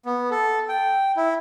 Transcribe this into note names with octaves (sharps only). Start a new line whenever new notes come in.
B3
A4
G5
E4